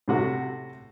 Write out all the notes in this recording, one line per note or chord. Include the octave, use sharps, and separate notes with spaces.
A2 C3 F#4 A4